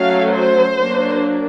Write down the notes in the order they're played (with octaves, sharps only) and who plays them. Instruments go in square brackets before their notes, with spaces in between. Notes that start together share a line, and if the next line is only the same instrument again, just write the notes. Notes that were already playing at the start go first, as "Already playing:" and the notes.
Already playing: [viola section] F#3 A3 C#4 F5
C5
F#3 A#3 D4